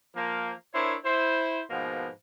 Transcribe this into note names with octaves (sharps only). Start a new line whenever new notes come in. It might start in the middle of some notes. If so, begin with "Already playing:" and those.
F3 A#3
D4 E4 A#4 C5 C#5 E5
E4 C5
G#2 B2 F3 A#3 B3